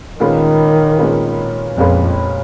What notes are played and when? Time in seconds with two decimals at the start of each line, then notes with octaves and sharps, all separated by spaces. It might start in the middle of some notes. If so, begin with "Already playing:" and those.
0.20 A#2 D#3 G#3 C#4 F4 B4
0.99 A#2 G#3 C#4 F4 B4
1.77 F2 A#2 G#3 C#4 F4 B4